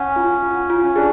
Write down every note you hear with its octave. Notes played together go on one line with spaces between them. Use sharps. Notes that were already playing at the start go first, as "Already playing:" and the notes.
Already playing: C#4 F#5
F4
F4
F4
C#4
D4 G#4